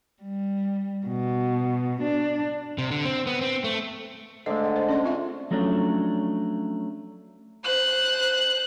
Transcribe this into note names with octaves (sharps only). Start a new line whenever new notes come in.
G3
B2
D4
C3
D3
C4
B3
C4
A3
G#2 D3 G#3 A3 D#5
F#5
C5
C#4 D5 C6
C4 F4 E5
F3 F#3 A3 C#4 D4
C5 F#6